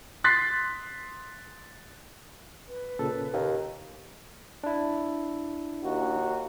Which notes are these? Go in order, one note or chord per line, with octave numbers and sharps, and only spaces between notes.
C6 F#6 A6 B6 C7
B4
A#2 C#3 A4
D#2
D4 E4
D#2 F#4